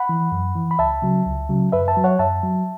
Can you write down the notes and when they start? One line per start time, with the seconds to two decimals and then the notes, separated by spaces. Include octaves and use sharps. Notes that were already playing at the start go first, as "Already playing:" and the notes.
Already playing: F#5 B5
0.09 E3
0.32 F#2
0.56 E3
0.71 B5
0.79 C#2 E5 A5
1.02 C#3 F#3
1.27 C#2
1.49 C#3 F#3
1.72 F#2 B4 E5
1.88 E5 A5
1.97 F#3
2.04 C#5 F#5
2.19 F#2 E5 A5
2.43 F#3